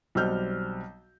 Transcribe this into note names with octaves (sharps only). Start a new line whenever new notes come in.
B1 G3 C4 F6 G6